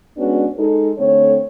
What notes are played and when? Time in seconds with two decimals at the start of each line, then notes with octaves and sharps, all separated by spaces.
0.17 G#3 B3 C#4 D4 F#4
0.57 G#3 D#4 A4
0.98 D3 A3 C4 C#5